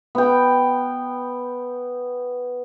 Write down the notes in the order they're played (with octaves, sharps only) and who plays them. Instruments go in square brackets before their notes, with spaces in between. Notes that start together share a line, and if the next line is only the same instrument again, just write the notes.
[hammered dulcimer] B3 G5